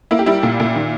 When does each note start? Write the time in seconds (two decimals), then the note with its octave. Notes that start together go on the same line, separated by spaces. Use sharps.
0.11 A#3 E4
0.19 G4
0.26 G3 E4
0.43 A#2
0.60 A#2
0.76 D#3